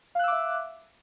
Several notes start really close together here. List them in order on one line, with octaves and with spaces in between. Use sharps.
F5 F#6 E6 D6 E5